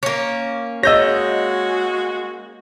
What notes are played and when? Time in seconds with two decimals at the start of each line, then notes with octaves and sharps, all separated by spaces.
0.03 A#3 C#4
0.83 G#3 F#4 C#5 D#5 E6 G6 A#6